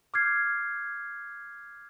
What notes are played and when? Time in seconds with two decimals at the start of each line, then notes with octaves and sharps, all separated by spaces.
0.14 D6 F6 G6 G#6 C7